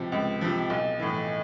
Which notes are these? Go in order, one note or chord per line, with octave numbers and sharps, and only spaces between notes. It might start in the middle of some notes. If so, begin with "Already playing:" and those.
Already playing: C#2 C3 F3
C#2
C3 F3
B1
A2 E3